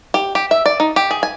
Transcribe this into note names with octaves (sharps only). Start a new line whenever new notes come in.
G4
G4
E5
D5
D#4
G4
G#4
G#5